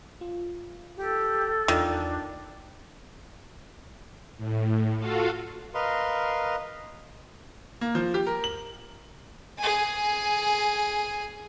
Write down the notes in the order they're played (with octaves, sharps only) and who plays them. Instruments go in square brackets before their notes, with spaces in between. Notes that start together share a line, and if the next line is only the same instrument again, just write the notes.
[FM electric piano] F4
[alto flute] G4 [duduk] A4
[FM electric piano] E2 F4 G6 [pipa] D#3 [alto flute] D4
[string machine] A2
F4 F#4 A4 F5
[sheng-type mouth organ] A#4 B4 D#5 F5 C6
[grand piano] A#3
F3
G4
A#4
F#7
[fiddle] G#4 G#5